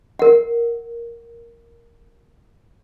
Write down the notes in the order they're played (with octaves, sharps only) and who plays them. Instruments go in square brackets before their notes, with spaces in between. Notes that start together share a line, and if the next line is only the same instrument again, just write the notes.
[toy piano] A#4 F#5